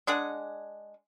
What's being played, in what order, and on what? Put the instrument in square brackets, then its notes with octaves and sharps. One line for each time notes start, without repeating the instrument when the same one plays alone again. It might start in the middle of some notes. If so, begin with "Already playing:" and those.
[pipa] G#3 D4 G#4 F#5